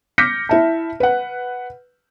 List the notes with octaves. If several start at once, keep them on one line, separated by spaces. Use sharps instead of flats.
D6 F6 G6 A#6 B6 C#7
E4 E5 A5
B4 F#5